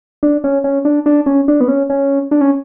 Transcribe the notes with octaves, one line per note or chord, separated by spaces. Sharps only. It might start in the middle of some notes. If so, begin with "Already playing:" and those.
D4
C#4
C#4
D4
D4
C#4
D4
B3
C#4
C#4
D4
C#4